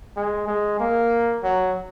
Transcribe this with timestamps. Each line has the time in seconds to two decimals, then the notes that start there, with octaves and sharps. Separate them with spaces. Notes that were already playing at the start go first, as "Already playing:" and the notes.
0.17 G#3
0.47 G#3
0.79 A#3
1.43 F#3